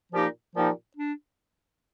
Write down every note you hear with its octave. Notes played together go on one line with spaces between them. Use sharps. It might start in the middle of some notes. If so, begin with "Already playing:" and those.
A#2 F3 A#3 D#4 G4
A#2 F3 A#3 D#4 G4
D4